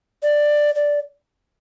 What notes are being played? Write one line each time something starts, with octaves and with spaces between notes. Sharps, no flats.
D5
D5